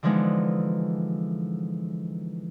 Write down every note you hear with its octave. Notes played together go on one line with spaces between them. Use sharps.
D3 E3 F3 G#3 B3 D#4